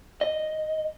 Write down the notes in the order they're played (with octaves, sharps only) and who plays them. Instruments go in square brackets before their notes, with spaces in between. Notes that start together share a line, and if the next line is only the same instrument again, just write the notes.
[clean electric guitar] D#5